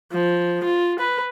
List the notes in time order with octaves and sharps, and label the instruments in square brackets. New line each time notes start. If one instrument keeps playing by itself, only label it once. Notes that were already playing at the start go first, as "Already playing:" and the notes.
[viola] F3
F4
B4